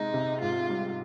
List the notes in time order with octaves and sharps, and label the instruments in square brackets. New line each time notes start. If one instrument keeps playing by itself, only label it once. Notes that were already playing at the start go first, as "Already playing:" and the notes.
Already playing: [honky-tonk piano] C3 G#3 [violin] D#4
[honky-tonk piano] C3
[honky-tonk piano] G#2 [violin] F4
[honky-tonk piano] G3